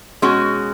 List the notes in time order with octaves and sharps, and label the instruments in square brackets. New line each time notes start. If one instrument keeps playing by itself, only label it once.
[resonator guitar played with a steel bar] B2 G#3 C#4 F#4